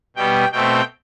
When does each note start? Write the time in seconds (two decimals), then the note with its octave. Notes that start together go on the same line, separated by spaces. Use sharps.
0.16 B2 G3 B3 G5
0.52 B2 A3 C4 G5